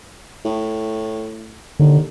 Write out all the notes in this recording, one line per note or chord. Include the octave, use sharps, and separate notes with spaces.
A2
D#2 D3